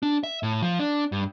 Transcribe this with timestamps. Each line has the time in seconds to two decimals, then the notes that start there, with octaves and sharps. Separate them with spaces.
0.03 D4
0.24 E5
0.43 A2
0.62 F3
0.79 D4
1.12 G2